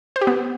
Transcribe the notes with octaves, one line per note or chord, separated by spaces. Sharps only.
C5
G4
B3